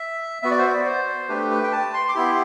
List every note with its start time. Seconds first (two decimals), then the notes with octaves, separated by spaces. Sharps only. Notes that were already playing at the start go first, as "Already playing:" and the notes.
Already playing: E5
0.42 B3 F#4 E5
0.51 D5
0.59 C5
0.67 D5
0.86 C5
1.29 A3 D4 G4 B4
1.51 B4
1.63 G5
1.72 A5
1.94 C6
2.09 D6
2.15 B3 E4 G4 C6